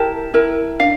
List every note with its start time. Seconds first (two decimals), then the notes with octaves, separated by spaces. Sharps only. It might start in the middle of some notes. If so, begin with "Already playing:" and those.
Already playing: E4 G4 A#4 A5
0.34 E4 A#4
0.79 D4 F5